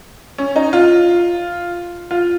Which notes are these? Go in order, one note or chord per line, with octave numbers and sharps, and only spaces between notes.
C#4
D#4
F4
F4